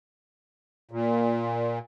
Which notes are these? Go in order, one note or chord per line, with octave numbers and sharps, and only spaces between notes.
A#2